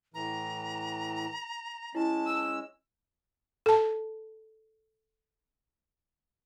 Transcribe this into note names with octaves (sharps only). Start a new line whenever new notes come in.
A2 E3 A#5
G#3 C#4 E4 A5
E6
A4 A5